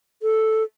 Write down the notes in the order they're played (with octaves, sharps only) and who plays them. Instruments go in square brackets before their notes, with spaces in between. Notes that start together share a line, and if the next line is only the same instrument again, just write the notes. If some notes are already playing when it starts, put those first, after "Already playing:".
[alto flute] A4